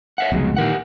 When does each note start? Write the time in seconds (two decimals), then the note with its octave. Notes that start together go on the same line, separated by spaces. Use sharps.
0.18 C#5 E5 F#5
0.32 F1 C#2 B2 F#3 G#3
0.56 A#2 D#3 E3 G4 A#4 F#5